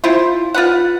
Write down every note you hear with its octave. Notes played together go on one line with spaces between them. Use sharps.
C4 E4 F4
F4 B4 F#5